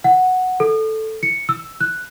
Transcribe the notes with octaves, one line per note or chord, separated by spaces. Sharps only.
F#5
A4
C#7
E6
F#6